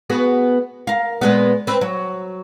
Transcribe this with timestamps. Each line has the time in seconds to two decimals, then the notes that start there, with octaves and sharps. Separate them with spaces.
0.10 B3 F#4 G#4
0.87 A#4 F5
1.21 A#2 G#3 B3
1.67 C4 B4
1.81 F#3